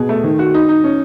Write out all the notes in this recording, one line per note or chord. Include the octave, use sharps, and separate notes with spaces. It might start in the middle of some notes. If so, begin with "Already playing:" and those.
Already playing: B2 G#4
A3
D#3
F#4
D#4
D#4
C#4